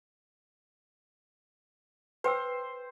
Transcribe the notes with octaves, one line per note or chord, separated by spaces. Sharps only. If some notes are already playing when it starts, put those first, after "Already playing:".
B4 C5 G5 E6